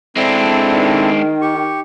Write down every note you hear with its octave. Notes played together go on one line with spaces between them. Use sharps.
G#3 C4 D4 E4 A4
D#3
G4 C#6